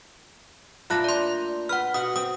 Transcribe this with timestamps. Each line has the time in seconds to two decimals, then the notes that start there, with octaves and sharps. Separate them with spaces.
0.90 A#2 A3 D4 B5 F#6 A#6
1.04 D5 C6
1.69 B4 F#5 F6
1.94 B2 F#4 F#5 D#6
2.16 C4 D#6